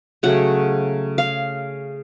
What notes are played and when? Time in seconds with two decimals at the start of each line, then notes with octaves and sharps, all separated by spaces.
0.23 C#3 F#3 A3 F#5
1.18 F5